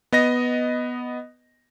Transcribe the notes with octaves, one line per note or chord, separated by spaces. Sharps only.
B3 D#5 A#6